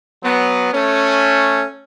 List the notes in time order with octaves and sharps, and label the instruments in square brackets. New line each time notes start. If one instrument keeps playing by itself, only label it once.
[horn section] F#3 B3
A3 C#4